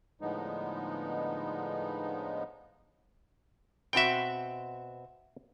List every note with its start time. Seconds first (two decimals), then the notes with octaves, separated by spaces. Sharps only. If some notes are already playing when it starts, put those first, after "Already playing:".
0.21 A2 D3 F3 G#3 B3 D#4
3.93 B2 C4 F#4 E5 G5